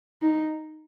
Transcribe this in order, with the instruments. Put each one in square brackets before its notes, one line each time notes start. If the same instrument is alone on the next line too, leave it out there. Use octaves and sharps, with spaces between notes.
[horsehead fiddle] D#4